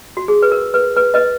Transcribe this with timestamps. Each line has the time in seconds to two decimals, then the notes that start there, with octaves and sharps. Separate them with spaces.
0.17 F#4
0.28 G#4
0.42 B4
0.52 A#4
0.74 B4
0.96 B4
1.14 B4 D#5